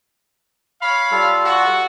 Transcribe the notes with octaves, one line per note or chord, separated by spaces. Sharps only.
C#5 F5 B5
G3 F4 A4
F#4